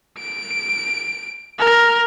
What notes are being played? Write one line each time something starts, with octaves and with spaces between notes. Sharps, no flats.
D7
A#4